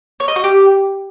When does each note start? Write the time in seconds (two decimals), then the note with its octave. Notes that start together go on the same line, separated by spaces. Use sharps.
0.20 C#5
0.28 D#5
0.36 F#4
0.44 G4